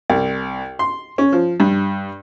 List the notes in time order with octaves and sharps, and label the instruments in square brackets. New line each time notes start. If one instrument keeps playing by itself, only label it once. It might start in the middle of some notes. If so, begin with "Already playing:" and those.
[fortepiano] C2
C6
C#4
F3
G2